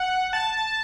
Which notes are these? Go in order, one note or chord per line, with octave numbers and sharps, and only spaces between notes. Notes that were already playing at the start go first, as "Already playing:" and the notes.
Already playing: F#5
A5